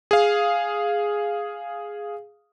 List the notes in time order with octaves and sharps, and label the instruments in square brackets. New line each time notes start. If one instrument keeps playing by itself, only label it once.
[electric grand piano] G#4 F5